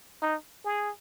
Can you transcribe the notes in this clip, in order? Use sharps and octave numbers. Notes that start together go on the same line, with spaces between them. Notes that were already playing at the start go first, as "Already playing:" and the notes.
D#4
G#4